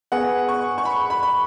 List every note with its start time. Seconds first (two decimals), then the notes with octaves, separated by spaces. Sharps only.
0.12 B3 G#4 B4 F#5 G#5
0.49 C#6
0.78 C#6
0.85 B5
1.10 B5
1.23 B5